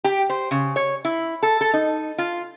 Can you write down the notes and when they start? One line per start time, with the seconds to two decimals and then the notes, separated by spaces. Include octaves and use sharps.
0.04 G4
0.30 C5
0.51 C#3
0.76 C#5
1.05 E4
1.43 A4
1.61 A4
1.73 D#4
2.18 F4